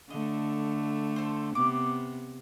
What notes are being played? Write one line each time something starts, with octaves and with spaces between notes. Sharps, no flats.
D3 A3 D#5
A4 C5
C3 B3 D6